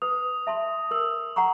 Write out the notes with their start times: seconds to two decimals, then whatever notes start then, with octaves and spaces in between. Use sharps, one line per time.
0.02 B4 D#6
0.47 E5 A5 C6
0.91 A#4 E6
1.36 F#5 A#5 C#6